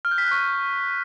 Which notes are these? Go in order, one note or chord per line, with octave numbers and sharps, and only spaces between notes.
F6
G6
B6
F#6
C#6